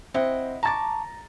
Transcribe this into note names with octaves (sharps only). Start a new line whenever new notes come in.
C4 E4 D#5 F#5
A5 A#5 C#6 D6 A6